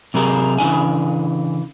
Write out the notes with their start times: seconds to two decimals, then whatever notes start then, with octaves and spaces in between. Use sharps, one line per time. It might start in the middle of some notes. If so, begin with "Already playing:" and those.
0.14 C3 F#3 G4 G#4 A#4
0.58 C#3 E3 D4 G#5